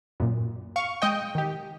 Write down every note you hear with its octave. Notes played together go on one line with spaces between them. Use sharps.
F#2 A#2
F5 C#6
G#3 D#5 G5
D#3 G4